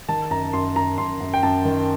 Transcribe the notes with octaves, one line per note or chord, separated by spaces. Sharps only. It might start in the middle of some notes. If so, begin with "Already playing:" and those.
D#3 A5
F#2 A#5
F#2 C6
F#2 A#5
F#2 C6
F#2
G5
F#2 A5
D#3